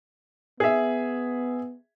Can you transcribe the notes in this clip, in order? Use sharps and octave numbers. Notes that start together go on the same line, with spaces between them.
B3 G#4 E5